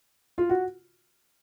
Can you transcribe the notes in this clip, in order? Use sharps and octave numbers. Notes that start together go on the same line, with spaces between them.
F4
F#4